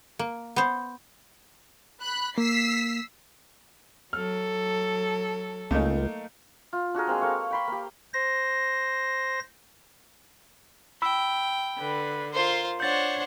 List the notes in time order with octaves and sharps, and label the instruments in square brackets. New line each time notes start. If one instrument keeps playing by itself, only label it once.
[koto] A#3
B3 C5
[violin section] B5 F#6
[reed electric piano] A#3 [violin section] E6 B6 C7
[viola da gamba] F#3 A4 [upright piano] F6
[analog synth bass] C#2 [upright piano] A3 A#3 D#4
[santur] F4
D4 F#4 G#4 A#4
G#3 A#3 C4
A#3 A4 F5 C#6
G5 B5 C6
A#3 G4
[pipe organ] C5 A#6
[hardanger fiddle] G5 [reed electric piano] B5 E6
[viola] D3 B4
[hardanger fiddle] F4 C5 [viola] A#4
[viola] D4 C#5 [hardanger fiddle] C5 F#5 [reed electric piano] G6 A6